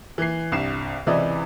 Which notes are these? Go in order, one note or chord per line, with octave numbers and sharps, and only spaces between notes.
E3 C7
C2 G2 C7 E7
C#2 C3 E3 E4 D5 D#5